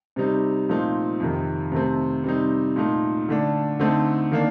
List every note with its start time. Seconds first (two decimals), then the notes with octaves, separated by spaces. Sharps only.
0.16 C3 G3 C4 D#4
0.69 A#2 F3 A3 C4 D#4
1.20 F2 C3 D#3
1.72 C3 D#3 A3 C4
2.24 C3 G3 C4 D#4
2.76 A#2 A3 D#4
3.29 D3 A3 D4
3.79 D3 A3 C4 D#4
4.32 D#3 A#3 D4